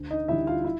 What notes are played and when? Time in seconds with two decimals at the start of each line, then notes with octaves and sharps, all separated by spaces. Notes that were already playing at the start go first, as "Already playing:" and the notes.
Already playing: D2
0.11 D#4 D#5
0.28 D3 G3 E4 E5
0.47 F4 F5
0.65 E4